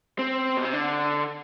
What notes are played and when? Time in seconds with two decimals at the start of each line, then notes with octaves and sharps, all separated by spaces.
0.19 C4
0.57 B2
0.65 C3
0.73 D3